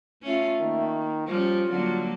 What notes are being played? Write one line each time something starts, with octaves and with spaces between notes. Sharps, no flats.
A3 C#4 F4
D#3 A#3
F3 G3 C#4 F4
D3 F#3 G3 A#3